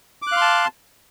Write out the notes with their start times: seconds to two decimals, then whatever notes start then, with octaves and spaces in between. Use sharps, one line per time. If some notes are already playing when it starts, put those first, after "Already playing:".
0.22 D6
0.27 F#6
0.32 F5
0.37 C6
0.42 A5